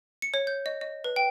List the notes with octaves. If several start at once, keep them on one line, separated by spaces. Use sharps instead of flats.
C#7
C#5
G6
D#5
D#5
B4
G5